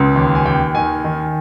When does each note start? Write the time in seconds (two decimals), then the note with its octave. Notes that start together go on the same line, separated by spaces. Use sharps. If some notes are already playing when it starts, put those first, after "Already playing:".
Already playing: C#2 C#3
0.16 D#2
0.35 G#5
0.46 D#2 G5
0.75 D#3 G#5
1.04 D#3